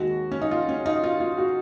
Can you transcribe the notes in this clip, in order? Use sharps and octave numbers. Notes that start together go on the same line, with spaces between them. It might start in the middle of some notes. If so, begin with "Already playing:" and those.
Already playing: D#2 D#3 G#3 F#4
C#4
D#4
F4
C#4
D#4
F4
F4
F#4